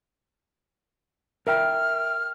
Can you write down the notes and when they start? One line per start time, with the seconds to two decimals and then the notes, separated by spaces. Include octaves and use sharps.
1.47 A#4 E5 G5 F6